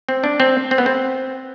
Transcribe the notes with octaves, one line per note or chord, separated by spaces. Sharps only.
C4
D4
C4
C4
B3
C4